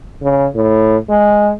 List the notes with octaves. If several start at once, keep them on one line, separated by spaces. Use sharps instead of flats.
C#3
A2
G#3